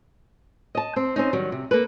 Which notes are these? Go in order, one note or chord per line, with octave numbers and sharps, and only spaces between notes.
D#5 A5
C4
C4 C#4 D#4
D#3 F#3 G3
C3
A#3 A4 B4